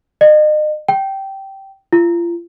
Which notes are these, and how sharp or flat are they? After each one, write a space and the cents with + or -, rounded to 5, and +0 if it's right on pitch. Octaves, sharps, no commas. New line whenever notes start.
D#5 -40
G5 -15
F4 -35